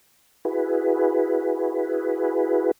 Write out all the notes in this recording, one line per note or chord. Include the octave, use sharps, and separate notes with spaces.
E4 F#4 G#4 B4